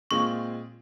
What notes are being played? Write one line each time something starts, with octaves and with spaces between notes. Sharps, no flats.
A#2 G#3 C4 F4 G#4 C#6